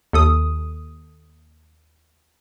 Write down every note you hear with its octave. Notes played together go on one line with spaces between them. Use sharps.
D#2 A4 D#6